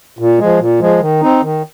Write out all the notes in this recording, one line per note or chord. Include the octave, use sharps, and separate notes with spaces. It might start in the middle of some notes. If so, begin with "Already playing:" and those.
A#2
F3 G#3
A#2
F3 G#3
D#3
C4 D#4
D#3